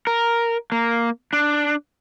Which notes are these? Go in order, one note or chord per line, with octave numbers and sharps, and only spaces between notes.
A#4
A#3
D4